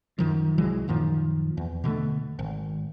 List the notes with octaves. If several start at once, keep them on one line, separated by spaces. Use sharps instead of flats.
F#2 D#3 F3
C2 E3 F#3 G#3
F#2 A#2 D#3 F3
E2
B2 D3 F3 A3
G#1